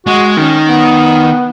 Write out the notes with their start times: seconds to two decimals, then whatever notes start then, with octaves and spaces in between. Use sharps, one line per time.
0.06 G#3 F#4
0.37 D#3 C#4
0.68 B3